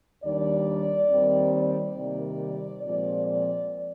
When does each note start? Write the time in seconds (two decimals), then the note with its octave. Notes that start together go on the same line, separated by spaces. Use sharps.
0.24 D#2 D#3 G3 D4 D5
1.10 D#2 D#3 G3 C4
1.54 D5
1.97 C3 D#3 G3 A#3
2.84 A#2 F3 G#3 C4 D5
3.27 D5